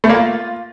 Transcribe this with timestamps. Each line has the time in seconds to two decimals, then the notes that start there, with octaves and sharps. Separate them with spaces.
0.04 A3
0.09 A#3
0.15 F4